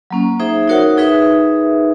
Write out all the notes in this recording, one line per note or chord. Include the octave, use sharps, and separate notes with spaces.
F#3 A#3 C#4
D#4 G#4 C5 E5
D#4 F#4 A#4 C#5 F#5
D#4 G#4 B4 E5